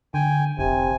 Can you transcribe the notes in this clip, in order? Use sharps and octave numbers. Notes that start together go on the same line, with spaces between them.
D3 G5 G#5
F1 C3 G#5